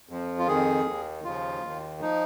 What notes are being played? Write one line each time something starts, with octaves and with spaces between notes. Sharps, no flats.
F2 F3
F4
F2 D#3 G#4
D#2 D#3
D#2 C#3 F3 F4
D#2 D#3
F3 D#4